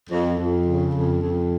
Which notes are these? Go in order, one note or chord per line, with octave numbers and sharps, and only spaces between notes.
F2
F2
C#3
F2
F2